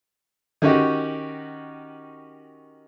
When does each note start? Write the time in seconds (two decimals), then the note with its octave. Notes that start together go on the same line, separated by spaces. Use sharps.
0.62 D#3 C#4 D#4 F#4 G4